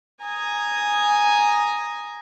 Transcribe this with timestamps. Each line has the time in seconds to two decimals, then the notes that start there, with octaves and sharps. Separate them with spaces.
0.23 G#5 A#5 D#6